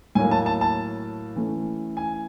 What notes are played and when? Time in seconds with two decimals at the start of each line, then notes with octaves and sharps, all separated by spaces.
0.15 A2 F#3 A#3 G#5
0.31 A5
0.46 A5
0.61 A5
1.36 E3 A3 C#4
1.97 G#5